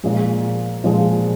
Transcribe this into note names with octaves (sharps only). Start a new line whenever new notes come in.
A#2 F3 G#3
A#2 F3 G#3